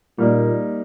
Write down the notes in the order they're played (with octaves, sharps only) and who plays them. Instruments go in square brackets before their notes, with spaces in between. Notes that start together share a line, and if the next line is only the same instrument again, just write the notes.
[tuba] A#2 [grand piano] G3 A#3 D#4